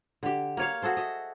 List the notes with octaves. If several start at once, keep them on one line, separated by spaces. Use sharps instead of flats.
D3 G4
A#3 C#5 F5
F#4 G#4 A4 C5
D#5 E5